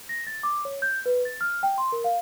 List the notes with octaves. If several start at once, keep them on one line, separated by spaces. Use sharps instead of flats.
A#6
A6
D6
C#5
G6
B4
A6
F6
G5
C6
A#4
F5